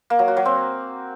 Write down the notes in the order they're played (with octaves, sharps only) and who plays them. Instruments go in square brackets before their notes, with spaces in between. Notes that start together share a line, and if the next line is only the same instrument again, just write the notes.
[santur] A#3
F#3
F#4
F#3
C4